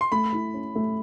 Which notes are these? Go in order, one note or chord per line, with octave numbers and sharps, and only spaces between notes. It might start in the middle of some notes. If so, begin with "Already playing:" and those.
C6
A3 B5
E4
C#4
A3